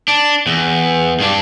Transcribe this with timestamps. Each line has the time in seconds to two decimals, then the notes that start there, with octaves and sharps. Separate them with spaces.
0.08 D4
0.46 E2
1.20 G2 D4